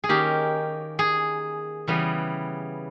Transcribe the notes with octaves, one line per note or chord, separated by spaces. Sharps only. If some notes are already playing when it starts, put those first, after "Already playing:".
G#4
D#3 A#3 C#4 G4
G#4
C#3 E3 G3 B3